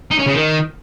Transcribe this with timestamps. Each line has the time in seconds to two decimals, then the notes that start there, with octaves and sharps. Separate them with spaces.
0.11 D#4
0.19 C#4
0.27 C#3
0.34 D#3